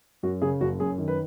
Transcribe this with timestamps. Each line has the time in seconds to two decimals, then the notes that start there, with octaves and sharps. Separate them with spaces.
0.23 F#2 F#4
0.42 C#3 G#4
0.61 F#1 F#4
0.80 F#2 G#4
0.98 D#3
1.08 B4